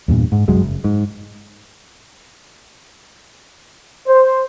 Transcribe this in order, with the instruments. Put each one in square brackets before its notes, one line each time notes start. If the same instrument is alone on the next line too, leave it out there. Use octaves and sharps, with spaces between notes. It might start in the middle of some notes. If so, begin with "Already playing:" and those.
[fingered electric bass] E2 G2 A#2
G#2
C2 F#2 F#3 G#3
F#1
G#2
[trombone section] C5